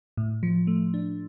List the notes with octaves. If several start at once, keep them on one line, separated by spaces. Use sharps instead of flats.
A2
F3
A3
D4